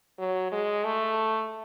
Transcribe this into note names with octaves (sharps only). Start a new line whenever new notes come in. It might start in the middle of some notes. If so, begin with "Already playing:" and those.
F#3
G#3
A3